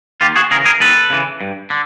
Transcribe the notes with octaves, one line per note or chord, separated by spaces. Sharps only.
D#2 F4 G4
F#4 G#4
C#3 E3 G#4 A#4
G#4 A#4
D#2 A4 B4
C#3 E3
G2
D3